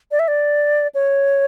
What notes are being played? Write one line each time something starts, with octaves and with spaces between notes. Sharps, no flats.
D5
E5
D5
C#5